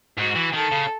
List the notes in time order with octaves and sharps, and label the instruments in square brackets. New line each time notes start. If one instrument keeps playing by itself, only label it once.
[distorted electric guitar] G#2 [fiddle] F#4
[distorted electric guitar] E3
[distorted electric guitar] D#3 [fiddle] A4
[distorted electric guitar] C#3